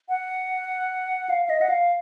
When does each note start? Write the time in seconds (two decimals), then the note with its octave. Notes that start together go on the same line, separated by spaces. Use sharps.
0.09 F#5
1.30 F5
1.45 F5
1.50 D#5
1.61 F#5
1.70 F5